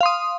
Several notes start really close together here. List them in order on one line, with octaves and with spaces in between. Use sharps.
F5 C6 D#6